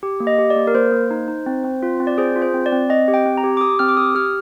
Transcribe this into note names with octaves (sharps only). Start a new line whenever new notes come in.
G4
A#3
D#5
G4
D5
A#3
A#4
A#3 C5
A#3
D#4
D#4
C4
C4
F4
C4
D5
G#4 C5
F4
C5
C4
D5
C4
C4 D#5
G4
G5
C4
A#5
G4
D6
G4 D#6
C4 F6
D6
G4 D#6
G4 F6